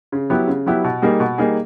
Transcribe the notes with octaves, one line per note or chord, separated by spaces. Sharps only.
C#3
F#3 B3 E4 G4
C#3
F#3 B3 E4 G4
B2
G3 A#3 D#4 G#4
B2
G3 A#3 D#4 G#4